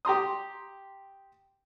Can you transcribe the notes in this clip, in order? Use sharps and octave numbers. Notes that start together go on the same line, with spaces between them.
G4 A#5 C6 D#6